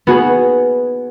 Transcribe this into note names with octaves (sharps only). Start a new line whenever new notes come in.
B3 F#4 G#4